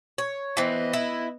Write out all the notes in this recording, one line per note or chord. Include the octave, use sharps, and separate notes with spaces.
C#5
E3 B3 C4 D#5
E4